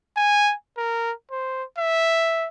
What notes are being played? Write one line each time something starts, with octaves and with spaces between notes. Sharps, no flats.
G#5
A#4
C5
E5